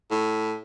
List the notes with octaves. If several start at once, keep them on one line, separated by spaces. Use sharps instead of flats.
A2